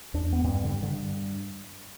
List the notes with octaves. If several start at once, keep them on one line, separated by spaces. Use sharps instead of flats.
E2 D4
B3
G2 C4
D3
G2
D3